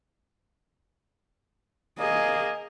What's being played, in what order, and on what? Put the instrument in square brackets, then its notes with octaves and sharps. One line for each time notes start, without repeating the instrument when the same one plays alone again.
[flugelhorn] A#3 [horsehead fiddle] G#4 D#5